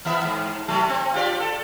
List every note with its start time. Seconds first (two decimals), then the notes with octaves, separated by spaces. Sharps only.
0.05 E3 B3 E5
0.23 G#2
0.68 C3 F#3 A3
0.89 C4
1.14 F4 G4 D5
1.40 A4